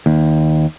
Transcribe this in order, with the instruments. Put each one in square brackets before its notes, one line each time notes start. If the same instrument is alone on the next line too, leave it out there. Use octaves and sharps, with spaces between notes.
[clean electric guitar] D#2